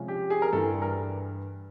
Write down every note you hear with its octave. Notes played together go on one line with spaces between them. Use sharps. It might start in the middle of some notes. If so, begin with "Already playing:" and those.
Already playing: C3 F3 G#3 C#4
G4
G#4
A#4
G2 E3 G3 A4
A#4